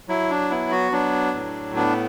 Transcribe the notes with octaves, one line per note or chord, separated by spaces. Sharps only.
F#3 E4
D4
B3 E4
F#4
F#3 D4
A2
B3 D4